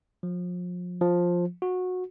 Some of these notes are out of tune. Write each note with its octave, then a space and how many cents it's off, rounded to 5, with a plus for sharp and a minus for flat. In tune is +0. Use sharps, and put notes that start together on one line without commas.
F3 +35
F3 +10
F#4 -20